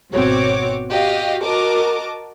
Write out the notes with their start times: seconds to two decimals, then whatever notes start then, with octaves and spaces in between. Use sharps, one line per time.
0.12 G#1 B2 C4 F#4 C#5 D6
0.89 F#4 G4 D#5 F5
1.44 F#4 A#4 D#5 A5 D6